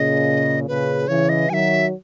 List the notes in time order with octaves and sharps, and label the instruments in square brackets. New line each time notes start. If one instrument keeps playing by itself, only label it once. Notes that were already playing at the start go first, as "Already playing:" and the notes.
Already playing: [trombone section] A#2 C#3 [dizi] D#5
[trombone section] A#2 C#3 [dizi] B4
[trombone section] C#3 E3 [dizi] C#5
[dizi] D#5
[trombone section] D#3 F#3 [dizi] G#5
[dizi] E5